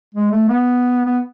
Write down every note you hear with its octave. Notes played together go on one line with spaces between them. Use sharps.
G#3
A3
B3
B3